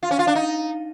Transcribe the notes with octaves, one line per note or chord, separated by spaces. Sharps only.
F4
C#4
F4
D4
D#4